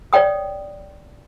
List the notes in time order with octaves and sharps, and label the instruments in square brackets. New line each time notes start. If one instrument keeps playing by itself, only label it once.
[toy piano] C#5 D5 G5 D#6